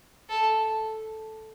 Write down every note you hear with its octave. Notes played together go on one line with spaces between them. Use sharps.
A4